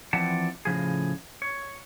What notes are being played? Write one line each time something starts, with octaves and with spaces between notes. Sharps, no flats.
E3 F3 C4 D5 F#5 A5
A2 C#3 F3 G#4
C#5